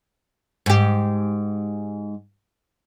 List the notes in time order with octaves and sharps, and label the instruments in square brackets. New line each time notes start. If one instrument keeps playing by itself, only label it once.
[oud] G#2 G4